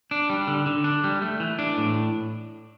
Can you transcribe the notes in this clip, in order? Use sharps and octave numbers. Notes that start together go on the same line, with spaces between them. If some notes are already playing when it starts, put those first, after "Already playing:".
D4
G3
D3
D3
D4
G3
A3
E3
D4
A2